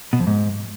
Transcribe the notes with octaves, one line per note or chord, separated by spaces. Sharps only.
B2
F2
G#2